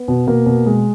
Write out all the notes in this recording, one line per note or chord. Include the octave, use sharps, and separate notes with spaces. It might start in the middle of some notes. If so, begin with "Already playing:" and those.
Already playing: B3
B2
B2 A#3
B2
B2 G#3